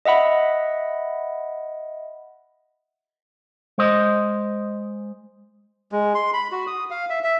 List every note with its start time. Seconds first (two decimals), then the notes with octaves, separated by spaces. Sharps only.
0.05 D#5 E5 F#5 B5
3.78 G#3 C5 D#5
5.92 G#3
6.15 C6
6.34 B5
6.52 F#4
6.67 D#6
6.90 F5
7.10 E5
7.24 E5